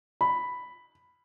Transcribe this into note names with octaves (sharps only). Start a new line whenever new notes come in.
B5